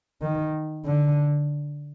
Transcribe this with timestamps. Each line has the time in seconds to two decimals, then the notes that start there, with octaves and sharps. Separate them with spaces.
0.22 D#3
0.86 D3